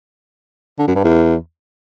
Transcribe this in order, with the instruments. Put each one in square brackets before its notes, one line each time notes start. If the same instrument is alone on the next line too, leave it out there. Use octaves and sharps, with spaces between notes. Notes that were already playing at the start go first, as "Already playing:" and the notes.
[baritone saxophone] D3
F#2
G2
E2